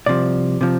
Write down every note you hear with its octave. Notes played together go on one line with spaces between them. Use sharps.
C2 C3 F3 D5
C3 F3